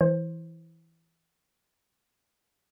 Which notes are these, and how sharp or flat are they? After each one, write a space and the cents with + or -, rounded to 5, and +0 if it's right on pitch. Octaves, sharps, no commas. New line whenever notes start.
E3 +0 C5 +20